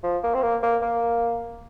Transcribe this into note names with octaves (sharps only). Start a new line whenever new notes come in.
F3
A#3
C4
A#3
A#3
A#3